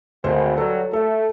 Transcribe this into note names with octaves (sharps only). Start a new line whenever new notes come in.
G#1 D2 C5
G2 F#3 A4
A3 A4